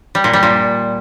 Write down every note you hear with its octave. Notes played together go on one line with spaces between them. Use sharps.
G3
A#2
G3
A#2